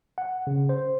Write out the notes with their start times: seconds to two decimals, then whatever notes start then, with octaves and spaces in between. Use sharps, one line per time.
0.18 F#5
0.47 C#3
0.69 C5